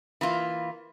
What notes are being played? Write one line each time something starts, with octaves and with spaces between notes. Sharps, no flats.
E3 A#3 F4